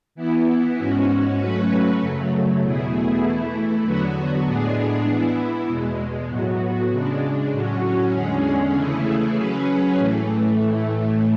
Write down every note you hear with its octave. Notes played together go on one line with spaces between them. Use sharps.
E3 B3 E4
G#2 G#3 C#4 F#4
F#3 A3 C#4 F#4 B4
F#2 C#3 F#3 A3
E2 B2 A3 E4 G#4
E3 A3 E4
E2 D3 F#3 B3 F#4
A2 G#3 B3 D4 G#4
E3 B3 E4
E2 B2 G#3
A2 F#3 B3 F#4
C#3 G#3 D4
A2 F#3 C#4 F#4
E2 D3 G#3 C#4 G#4
C#3 E3 A3 E4 G#4
F#3 C#4 G#4 B4
A2 E3 A3